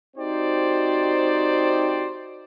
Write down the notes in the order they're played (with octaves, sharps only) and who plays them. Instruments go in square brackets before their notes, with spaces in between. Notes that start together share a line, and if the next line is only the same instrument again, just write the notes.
[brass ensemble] C4 D#4 F#4 G4 C5 D5